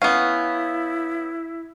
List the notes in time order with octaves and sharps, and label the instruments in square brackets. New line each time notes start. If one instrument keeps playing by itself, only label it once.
[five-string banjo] B3 C#4 [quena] E4 [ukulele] F5